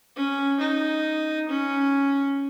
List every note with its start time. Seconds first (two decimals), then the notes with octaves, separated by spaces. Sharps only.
0.16 C#4
0.60 D#4
1.49 C#4